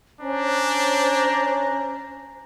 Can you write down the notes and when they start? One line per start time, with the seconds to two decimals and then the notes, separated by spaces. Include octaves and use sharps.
0.21 C#4 D4 C5 A#5